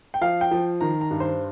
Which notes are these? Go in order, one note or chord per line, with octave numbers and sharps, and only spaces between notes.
G5
F3 F5
G5
F3
D#3 A#5
A#5
G2
C5